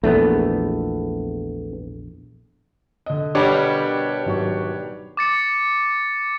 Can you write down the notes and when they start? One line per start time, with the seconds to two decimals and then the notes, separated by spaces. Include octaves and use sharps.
0.04 A#1 E2 A3 B3
3.06 D3 D#5
3.35 B2 G3 D4 G4 A#4 C#5
4.26 G#1 F#3 C#6
5.17 D6 A6 C#7